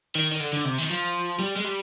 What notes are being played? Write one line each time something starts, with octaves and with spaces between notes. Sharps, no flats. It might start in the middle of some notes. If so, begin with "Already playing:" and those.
D#3
D#3
D3
D3
C3
D#3
F3
G3
G#3
G3